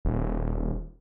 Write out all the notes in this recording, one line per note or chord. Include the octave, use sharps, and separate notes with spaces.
D#1